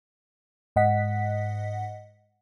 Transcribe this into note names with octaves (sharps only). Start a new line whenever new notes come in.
G#2 D#5 F#5 B6